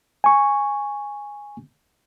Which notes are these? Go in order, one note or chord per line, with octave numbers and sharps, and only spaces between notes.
G#5 C#6